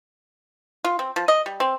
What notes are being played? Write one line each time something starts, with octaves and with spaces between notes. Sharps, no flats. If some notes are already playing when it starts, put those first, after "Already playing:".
F4
C4
F3
D#5
G3
C4